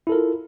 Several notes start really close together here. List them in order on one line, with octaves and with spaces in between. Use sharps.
E4 A4 A#4 F4